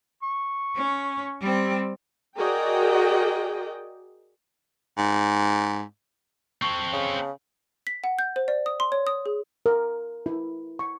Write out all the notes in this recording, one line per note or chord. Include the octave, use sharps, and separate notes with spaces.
C#6
C#4
G3 C4
F#4 G#4 A#4 D5 D#5 G5
G#2
C4 A4 C#6
C#3
B6
F#5
G6
C5
D5
D#6
C6
C#5
D#6
G#4
A#4
E4
C#6